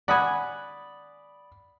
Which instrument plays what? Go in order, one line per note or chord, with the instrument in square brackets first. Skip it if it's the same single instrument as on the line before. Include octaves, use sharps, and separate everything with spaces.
[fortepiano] D5 B5 D#6 [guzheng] F#5 G#5